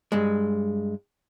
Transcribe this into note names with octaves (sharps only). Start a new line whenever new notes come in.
G2 G#3